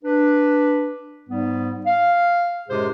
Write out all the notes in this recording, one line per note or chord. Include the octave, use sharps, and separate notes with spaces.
D4 B4
G#2 G3 B3
F5
F#2 A2 C3 G#3 G#4 C5